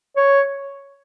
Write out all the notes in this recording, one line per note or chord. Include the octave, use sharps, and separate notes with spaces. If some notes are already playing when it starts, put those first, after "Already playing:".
C#5